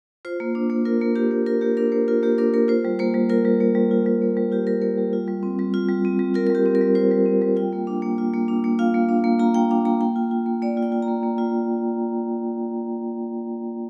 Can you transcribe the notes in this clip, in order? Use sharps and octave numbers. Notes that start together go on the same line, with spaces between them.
F4 C5
A#3
D4
A#3
F4 A#4
A#3
D4 G4
A#3
F4 A#4
A#3 G4
D4 A#4
A#3 C5
F4 A#4
A#3 G4
D4 A#4
A#3 A#4
F4 C5
G3
A#3 C5
G3
F4 A#4
G3
A#3
G3
F4
G3
A#3
G3
F4 G4
G3 A#4
A#3 A#4
G3
F4
G3
C4
G3
F4
G3
C4
G3
F4 A#4
A#4
G3 G4
C4
A#4
G3
F4 C5
G3
C4
G3
F4 G5
A#3
D4
A#3
F4
A#3
D4
A#3
F4 F5
A#3
D4
A#3
F4 A#5
A#3 G5
D4 G5
A#3 A#5
A#3 G5
F4
F4
A#3
A#3 D5
F4
G5
F4
A#5
A#3
A#3
F4